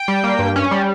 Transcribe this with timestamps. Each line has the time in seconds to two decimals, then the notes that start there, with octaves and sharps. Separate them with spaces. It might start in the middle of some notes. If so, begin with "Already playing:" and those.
Already playing: G5
0.08 G3
0.24 A#3
0.39 G2
0.56 C#4
0.71 G3